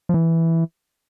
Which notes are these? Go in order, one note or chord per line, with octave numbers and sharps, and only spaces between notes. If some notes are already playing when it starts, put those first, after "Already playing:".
F3
E3